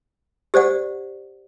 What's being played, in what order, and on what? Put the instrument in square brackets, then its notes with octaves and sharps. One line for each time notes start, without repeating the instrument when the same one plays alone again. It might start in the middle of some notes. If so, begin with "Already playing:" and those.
[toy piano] G4 C5 D5 F#5